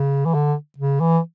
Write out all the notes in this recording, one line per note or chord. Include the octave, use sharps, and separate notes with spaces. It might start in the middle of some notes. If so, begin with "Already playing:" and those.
Already playing: C#3
E3
D3
C#3
E3